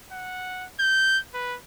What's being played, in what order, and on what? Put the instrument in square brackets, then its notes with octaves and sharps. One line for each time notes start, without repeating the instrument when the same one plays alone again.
[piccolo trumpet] F#5
G6
B4